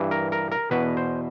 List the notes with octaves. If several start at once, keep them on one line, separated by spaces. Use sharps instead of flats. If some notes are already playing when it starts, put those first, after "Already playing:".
Already playing: G2 E3
A#4
A#4
A#4
E2 B2 B4
C5